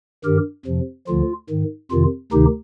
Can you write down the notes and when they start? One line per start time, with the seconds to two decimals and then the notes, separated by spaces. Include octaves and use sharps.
0.24 G2 D#3 G4 A#4
0.66 F2 C3 F3
1.08 D2 D3 F3 F4
1.50 G#2 D#3
1.91 F2 C3 D#3 F4
2.32 D2 C3 D#3 D#4 G4